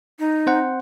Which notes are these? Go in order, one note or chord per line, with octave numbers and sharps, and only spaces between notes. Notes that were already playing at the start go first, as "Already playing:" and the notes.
D#4
C4 C5 F#5